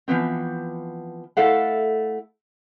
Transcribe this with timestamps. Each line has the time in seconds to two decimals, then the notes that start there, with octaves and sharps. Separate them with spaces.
0.08 E3 F3 B3 C4
1.37 A3 E4 A4 F5 F#5